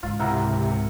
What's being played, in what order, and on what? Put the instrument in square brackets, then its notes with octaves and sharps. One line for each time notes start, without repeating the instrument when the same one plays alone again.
[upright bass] C#2 G#2 [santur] F4
[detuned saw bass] C3 [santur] E4 A#4 F#5